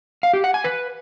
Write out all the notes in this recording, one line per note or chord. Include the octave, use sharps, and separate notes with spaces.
F5
G4
F#5
G#5
B4